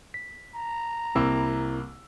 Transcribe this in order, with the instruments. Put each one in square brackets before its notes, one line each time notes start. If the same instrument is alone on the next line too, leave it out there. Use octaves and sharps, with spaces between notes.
[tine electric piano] B6
[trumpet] A#5
[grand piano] C2 A#3 E6 [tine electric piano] C4 E4